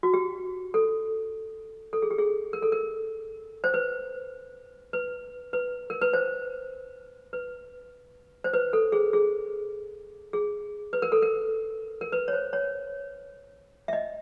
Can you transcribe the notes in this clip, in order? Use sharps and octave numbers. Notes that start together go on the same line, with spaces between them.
F#4
G4
A4
A4
G#4
G4
G#4
A#4
A4
A#4
C5
B4
B4
B4
A#4
B4
C5
B4
C5
B4
A4
G#4
G#4
G#4
B4
A#4
A4
A#4
A#4
B4
C#5
C5
C#5
E5
D#5